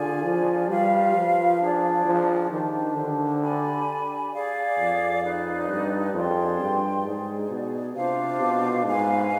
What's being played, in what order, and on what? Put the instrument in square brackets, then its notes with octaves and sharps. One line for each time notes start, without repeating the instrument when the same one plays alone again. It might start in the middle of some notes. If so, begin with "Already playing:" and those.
Already playing: [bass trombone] D3 [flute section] F4 G#4 D5 G#5
[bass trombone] F3
[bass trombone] G3 [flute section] F4 B4 F5
[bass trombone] F3
[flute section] D4 G#4 D5
[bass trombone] F3
[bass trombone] D#3 [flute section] D4 G4 C5
[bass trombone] D3
[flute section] G4 D5 G#5 B5
G#4 D5 F5
[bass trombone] F2
[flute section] D#4 B4 D5
[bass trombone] G2
[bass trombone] F2 [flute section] G#4 D5 G5 C6
[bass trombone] G2
[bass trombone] G#2 [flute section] D#4 G#4 D5
[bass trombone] B2
[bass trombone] C3 [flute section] D4 F4 C5 F5
[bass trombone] B2
[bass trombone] G#2 [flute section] B4 F5 G#5